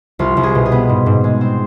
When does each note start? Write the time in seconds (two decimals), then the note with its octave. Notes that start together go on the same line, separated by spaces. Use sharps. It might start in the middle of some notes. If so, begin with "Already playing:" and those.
0.19 C2 F4
0.37 C2
0.43 G#4
0.55 B2
0.66 G#4
0.72 B3
0.89 G#2
1.06 G#2
1.24 G#3
1.41 C4